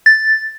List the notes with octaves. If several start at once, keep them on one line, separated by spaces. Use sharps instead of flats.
A6